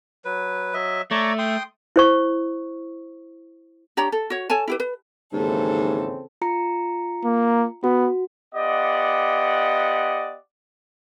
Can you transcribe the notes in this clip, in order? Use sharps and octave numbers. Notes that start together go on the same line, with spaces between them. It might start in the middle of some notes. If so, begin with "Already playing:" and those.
F#3 B4
F#3 D#5 E5
A3 C#5 D5 A#5
G5 C6 D#6
E4 C5 C#6
D4 G4 C#5 A#5
A4
F#4 C#5
A4 C#5 G#5 A5
E4 G4 B4
B4
D#2 G#2 C#3 E3 C4 A4
F4 A#5 C#7
A#3
B3 F#4
B3 F4 G4 D5 D#5 F#5